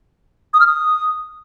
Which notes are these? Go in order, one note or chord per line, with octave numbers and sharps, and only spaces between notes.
D#6
F6
D#6